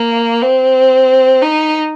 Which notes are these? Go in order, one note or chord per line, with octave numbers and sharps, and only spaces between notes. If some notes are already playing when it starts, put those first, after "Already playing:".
Already playing: A#3
C4
D#4